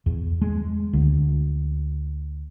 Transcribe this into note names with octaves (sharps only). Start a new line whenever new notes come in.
E2
G#3
D2